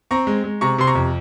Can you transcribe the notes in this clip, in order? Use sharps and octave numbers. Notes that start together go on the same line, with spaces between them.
C4 A#5 C#6
G#3
G#3
C3 A#5 C#6
C3 C6
A#5 C#6
F2